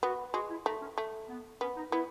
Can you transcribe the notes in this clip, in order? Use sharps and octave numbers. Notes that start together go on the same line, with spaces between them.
B3 F#4
G#3 F#4
E4
A3 D#4
C#4
A3
B3
B3 C#4
D#4
B3 E4